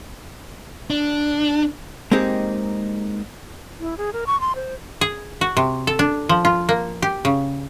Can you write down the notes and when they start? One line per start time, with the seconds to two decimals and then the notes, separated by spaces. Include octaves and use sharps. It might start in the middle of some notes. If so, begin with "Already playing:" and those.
0.90 D4
2.11 G#3 A#3 C4 D#4 G4 G#4
3.80 E4
3.98 G#4
4.13 A#4
4.27 C#6
4.40 C6
4.56 C5
5.01 G#4
5.41 F#4
5.57 C3
5.87 A4
5.99 D4
6.29 F3
6.45 F4
6.69 A#3
7.02 G4
7.25 C#3